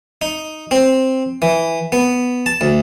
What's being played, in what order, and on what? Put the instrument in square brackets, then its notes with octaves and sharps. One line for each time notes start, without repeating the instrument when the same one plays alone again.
[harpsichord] D#4
C4
E3
B3
A5
D2